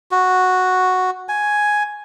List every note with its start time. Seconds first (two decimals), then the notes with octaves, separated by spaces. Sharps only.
0.11 F#4
1.29 G#5